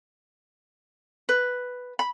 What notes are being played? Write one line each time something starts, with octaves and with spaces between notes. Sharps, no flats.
B4
B5